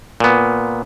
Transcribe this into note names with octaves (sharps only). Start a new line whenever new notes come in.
A#2 B3